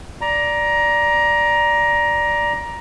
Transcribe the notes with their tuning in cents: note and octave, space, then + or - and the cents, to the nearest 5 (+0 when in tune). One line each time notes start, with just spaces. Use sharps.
D5 +0 A#5 +15